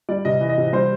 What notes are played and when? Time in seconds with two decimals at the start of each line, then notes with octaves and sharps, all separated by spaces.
0.09 G3 D5
0.25 C3 D#5
0.41 E3
0.49 D#5
0.58 C3
0.73 G3 C5